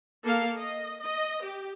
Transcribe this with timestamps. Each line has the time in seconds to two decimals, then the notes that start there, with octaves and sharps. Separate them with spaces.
0.23 A#3 A4 F5
0.57 D#5
1.02 D#5
1.44 G4